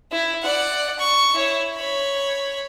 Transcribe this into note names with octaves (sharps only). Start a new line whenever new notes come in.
E4
D5 F#5
C#6
E4 C#5
C#5 B5